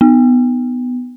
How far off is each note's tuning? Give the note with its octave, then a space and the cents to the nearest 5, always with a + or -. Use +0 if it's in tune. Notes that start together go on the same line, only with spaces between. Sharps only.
B3 +10